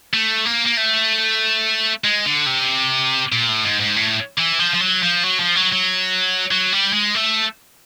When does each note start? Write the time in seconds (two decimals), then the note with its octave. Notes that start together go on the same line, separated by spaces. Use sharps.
0.14 A3
0.45 A#3
0.66 A#3
0.77 A3
2.04 G#3
2.26 D3
2.46 C3
3.32 A#2
3.49 A2
3.64 G#2
3.81 G#2
3.97 A2
4.39 E3
4.60 F3
4.74 F3
4.81 F#3
5.03 F3
5.24 F#3
5.40 F3
5.55 F#3
5.72 F#3
6.51 F#3
6.73 G3
6.93 G#3
7.15 A3